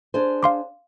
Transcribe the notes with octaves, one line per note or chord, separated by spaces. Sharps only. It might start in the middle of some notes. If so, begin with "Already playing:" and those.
D4 G#4 C5
F5 C6 D6